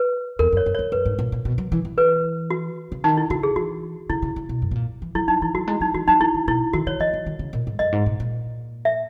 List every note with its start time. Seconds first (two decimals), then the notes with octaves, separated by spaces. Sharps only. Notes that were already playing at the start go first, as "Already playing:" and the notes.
Already playing: B4
0.39 E2 A#4
0.52 F#2
0.57 C#5
0.66 F#2
0.75 E2 C#5
0.92 F#2 B4
1.06 G#2
1.19 A#2
1.32 A#2
1.45 B2
1.58 F#3
1.72 E3
1.85 E3
1.98 B4
2.50 F#4
2.92 C#3
3.04 D#3 D#4
3.17 E4
3.30 C#3 F#4
3.43 G#4
3.56 E3 F#4
4.10 C#3 E4
4.22 C#3
4.36 C#3
4.49 B2
4.62 F#2
4.71 B2
4.75 A#2
5.02 E3
5.15 F#3 E4
5.28 F#3 D#4
5.42 E3 E4
5.55 F#3 F#4
5.67 G#3 E4
5.81 F#3 D#4
5.94 E3 F#4
6.08 F#3 D#4
6.21 E3 E4
6.34 D#3
6.47 B2 E4
6.73 D#3 F#4
6.87 D#3 C#5
7.00 E3 D#5
7.14 F#3
7.26 D#3
7.39 C#3
7.53 A#2
7.67 G#2
7.79 F#2 D#5
7.92 G#2
8.06 A#2
8.20 A#2
8.85 E5